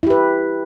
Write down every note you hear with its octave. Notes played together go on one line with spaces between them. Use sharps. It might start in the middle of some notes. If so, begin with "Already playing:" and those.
E4 G4 B4